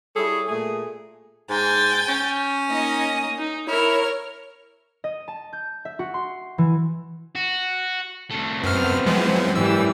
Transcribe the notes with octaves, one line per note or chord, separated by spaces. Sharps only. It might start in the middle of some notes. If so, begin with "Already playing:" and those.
G3 E4 G#4 A4 C#5
A#2 A3 G#4
G#2 G5 G#5 A6
C#4
A#3 D#4 D#5
D#4
E4 A#4 C#5 F6
D#5
A5
G6
E5
F#4
C6
E3
F#4
C2 A3
F#2 B3 C4 F6
F#2 E3 F3 G#3
G#2 E3 G3 E6